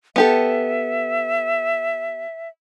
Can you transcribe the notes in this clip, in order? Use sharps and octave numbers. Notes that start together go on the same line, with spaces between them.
B3 G4 A4 E5